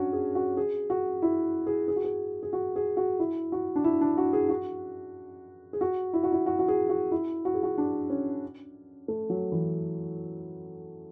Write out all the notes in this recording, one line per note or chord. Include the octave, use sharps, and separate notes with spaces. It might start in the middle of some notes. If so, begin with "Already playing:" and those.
Already playing: C#4 D4 F#4
G#4
F#4
G#4
F#4
E4
G#4
G#4
F#4
G#4
G#4
F#4
G#4
F#4
E4
F#4
D4
E4
D4
F#4
G#4
F#4
G#4
F#4
E4
F#4
E4
F#4
F#4
G#4
F#4
E4
F#4
G#4
F#4
D4
C#4
A3
F#3
E3